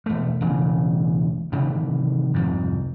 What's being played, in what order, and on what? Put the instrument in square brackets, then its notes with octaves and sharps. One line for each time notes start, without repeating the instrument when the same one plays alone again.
[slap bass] E1 A3
E1 A1 C#3
C3 D#3 E3 A3
C2 F2 G#2